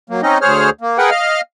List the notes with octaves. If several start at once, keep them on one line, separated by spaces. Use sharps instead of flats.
F#3 A#3
C4 C#4 D#4 D#5
D2 G#4 C5 C#5 F6
A#3
G#4 A#4 B4 F#5 G5
D#5 F5 F6